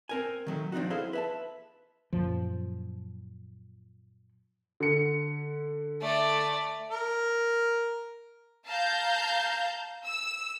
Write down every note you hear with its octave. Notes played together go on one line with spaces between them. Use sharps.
C4 A#4 G#5
D#3 F#3 A3
F3 C4 D4 D#4 F#4
E4 G#4 A4 C5 D#5 F5
B4 E5 A5
F#2 A#2 F3
D3 C#7
A3 D5
A#4
F5 A5 A#5 G6
E6